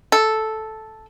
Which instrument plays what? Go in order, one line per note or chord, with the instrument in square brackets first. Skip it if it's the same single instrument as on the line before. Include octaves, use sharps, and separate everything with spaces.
[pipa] A4